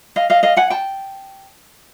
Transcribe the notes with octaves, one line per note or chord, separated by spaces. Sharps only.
D#5 F5
D#5 F5
D#5 F5
F#5 G#5
G5 A5